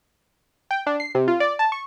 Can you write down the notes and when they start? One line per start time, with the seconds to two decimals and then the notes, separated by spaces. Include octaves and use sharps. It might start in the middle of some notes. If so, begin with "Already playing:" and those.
0.71 G5
0.87 D4
1.00 C7
1.15 C3
1.28 F4
1.40 D5
1.59 A5
1.72 C#6